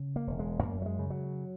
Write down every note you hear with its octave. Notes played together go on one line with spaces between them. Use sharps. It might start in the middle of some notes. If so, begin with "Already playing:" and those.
Already playing: C#3
A#3
E1
G#3
F#2 A#3
F#3
G#3
C#3
F#3